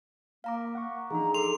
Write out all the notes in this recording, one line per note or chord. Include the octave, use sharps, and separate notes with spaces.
A#3 F5 A#5 D6
F#5 C#6
E3 F3 D4 D#4 G#4 A#5
A4 C6 D6 F7